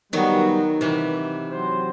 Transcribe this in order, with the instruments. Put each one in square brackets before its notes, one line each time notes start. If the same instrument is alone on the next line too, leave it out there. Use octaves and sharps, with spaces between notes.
[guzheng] D#3 F#3 [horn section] G3 B3 F#4
[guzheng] C3 E3
[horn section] F#3 C4 F#4 C5